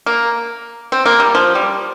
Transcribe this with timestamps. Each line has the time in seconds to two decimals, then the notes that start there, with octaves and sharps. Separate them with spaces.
0.06 A#3
0.92 C4
1.06 A#3
1.20 G3
1.35 F3
1.55 G3